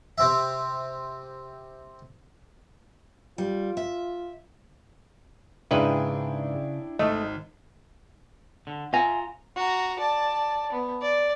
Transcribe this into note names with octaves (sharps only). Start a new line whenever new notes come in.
C3 C4 E5
G3 F4
E5
G#2 C#3 D4 E4 B4 D#5 G5
G#1 A3 D#5
D3
F4 E5 G#5 A#5
F#4 A#5
D5 A5
B3
D5